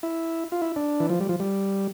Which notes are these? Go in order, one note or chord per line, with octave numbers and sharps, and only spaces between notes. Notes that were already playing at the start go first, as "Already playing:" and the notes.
E4
F4
E4
D4
E3
F3
G3
F3
G3